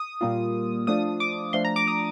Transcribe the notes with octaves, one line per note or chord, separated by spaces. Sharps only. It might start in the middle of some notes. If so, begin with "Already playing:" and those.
Already playing: D#6
A#2 G3 A#3 F4
F3 A3 D4 F4 D#6
D6
F3 A3 D4 C6
A#5
D6
D#6